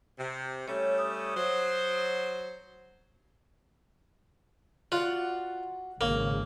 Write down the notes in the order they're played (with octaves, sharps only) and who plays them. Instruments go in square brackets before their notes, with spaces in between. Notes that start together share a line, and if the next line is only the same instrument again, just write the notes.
[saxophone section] C3
[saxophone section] G3 A3 C#4 [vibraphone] C#5
[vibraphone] D#6
[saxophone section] F#3 C5
[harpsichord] F4 [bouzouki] F#4 D5 F#5
[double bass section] G#1 C#3 [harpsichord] A#3 [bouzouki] C#4